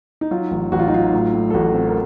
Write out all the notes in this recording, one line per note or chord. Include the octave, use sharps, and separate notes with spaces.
D#4
F#3 F4
A1
A1 F#4
F4
D#4
F#3 F4
A2
A2
A4
A1 F#4
C4
A#4